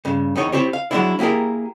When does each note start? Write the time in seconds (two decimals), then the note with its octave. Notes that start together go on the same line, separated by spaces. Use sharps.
0.05 G2 C#3
0.36 E2 D#3 D#4 C#5
0.52 C4 E4 G4 C#5
0.73 F5
0.91 F#3 G#3 A#3 C4 D4 E4
1.19 A#3 E4 G4 G#4 A#4